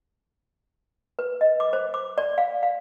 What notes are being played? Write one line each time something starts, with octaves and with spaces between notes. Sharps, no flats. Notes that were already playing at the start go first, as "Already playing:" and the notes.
B4
D#5
D6
C5
D6
D5
F5
F5